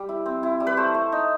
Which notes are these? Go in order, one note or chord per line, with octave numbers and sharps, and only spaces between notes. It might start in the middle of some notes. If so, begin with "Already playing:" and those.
Already playing: G3
E4
C4
E4
G3
B4
A3 C5
A3
D#4